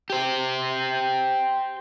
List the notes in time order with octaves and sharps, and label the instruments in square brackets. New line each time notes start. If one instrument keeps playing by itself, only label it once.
[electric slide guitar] G4 C5